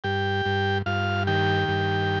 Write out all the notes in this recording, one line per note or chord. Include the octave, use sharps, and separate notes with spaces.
G2 G4 G5
G2
G2 F4 F5
D#3 G4 G5
G2